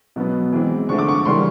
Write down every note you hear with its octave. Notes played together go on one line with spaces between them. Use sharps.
B2 F#3 B3
E3 G#3 C4
D3 F3 A3 C#6
D6
C#6
C#3 E3 G3 A#3 C#4 C6